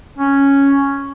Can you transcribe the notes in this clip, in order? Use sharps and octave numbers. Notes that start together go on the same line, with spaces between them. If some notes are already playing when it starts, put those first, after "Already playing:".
C#4